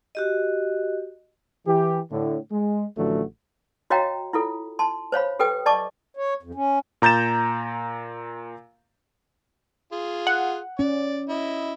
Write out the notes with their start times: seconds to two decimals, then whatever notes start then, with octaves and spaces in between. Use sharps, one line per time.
0.15 F#4 G4 D#5
1.66 E3 G4
2.11 A2 D3
2.51 G#3
2.96 A1 D3 F3 F#3 A3 F#4
3.90 F#4 C#5 D#5 F5 G5 A#5
4.33 E4 F4 A4
4.79 A5 C6
5.12 C5 C#5 F5 B5
5.39 G4 A4 B4 G5 D#6
5.66 D5 D#5 A5 C#6 D6
6.17 C#5
6.43 F2
6.55 C#4
7.02 A#2 A#5 G6 A6 E7
9.92 F4 G#4
10.27 F#5
10.79 C#4 D5
11.29 E4 D#5